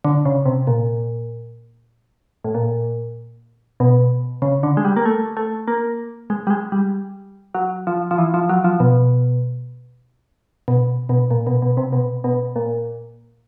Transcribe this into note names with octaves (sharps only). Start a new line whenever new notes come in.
D3
C#3
C3
A#2
A2
A#2
B2
C#3
D3
G#3
G3
A#3
A3
A3
A#3
G#3
G3
G#3
G3
F#3
F3
F3
E3
F3
F#3
F3
B2
B2
B2
A#2
B2
B2
C3
B2
B2
A#2